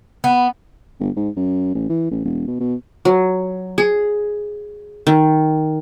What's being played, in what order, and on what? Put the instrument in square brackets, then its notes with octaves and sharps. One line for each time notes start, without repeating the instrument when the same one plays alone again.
[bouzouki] B3
[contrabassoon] G1
G#2
F#2
A1
E3
A1
E1
B2
B2
[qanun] F#3
G#4
D#3